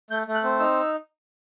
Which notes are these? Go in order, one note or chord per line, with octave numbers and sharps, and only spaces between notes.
A3 G6
A3
F#6
C4
D#4 E6